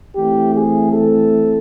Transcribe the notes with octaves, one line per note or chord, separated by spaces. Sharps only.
E3 A3 C4 G4
G#4
A4